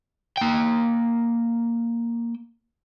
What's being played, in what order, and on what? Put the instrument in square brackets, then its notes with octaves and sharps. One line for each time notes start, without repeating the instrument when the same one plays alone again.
[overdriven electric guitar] A#3 G5